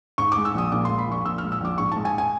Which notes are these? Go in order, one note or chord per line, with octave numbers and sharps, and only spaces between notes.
G#2 C#6
D6
G#3
E6
A#1 D#6
A#2 D6
C6
G#3
B5
A#1 C#6
A#2 E6
F6
G#3
E6
A#1 D6
G#2 C#6
A5
G#3
G#5
G#5